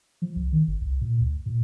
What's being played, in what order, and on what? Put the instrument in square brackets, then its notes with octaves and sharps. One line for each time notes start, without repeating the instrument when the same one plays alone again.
[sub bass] F3
C2
D#3
G1
C2
A#2
D2
A#2